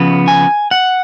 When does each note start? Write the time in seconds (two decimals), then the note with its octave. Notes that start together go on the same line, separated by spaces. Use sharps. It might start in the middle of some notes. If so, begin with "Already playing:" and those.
Already playing: C#3 F3 B3
0.28 G#5
0.71 F#5